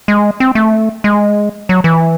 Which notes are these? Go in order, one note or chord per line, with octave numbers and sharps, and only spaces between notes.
G#3
C4
A3
G#3
F#3
E3